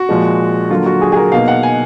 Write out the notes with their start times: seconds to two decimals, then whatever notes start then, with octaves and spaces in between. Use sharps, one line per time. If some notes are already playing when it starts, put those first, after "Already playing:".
Already playing: F#4
0.09 A#2 F3 G#3
0.70 D3 F#3 A#3 F4
0.86 F#4
1.01 G#4
1.12 G#4
1.16 A#4
1.32 B2 A#3 D#4 F5
1.48 F#5
1.63 G#5